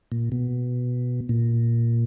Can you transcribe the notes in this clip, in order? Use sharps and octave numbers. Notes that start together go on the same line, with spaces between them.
A#2
B2
A#2